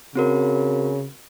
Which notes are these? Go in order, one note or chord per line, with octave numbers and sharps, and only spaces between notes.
C#3 C4 F#4 A#4